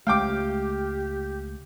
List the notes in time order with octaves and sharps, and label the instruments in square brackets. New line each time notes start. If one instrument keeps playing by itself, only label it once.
[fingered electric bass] C#2 G#3 A3 [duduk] G4 [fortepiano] F5 G5 D6